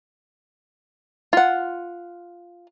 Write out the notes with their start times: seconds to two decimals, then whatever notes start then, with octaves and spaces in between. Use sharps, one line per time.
1.33 F4 F#5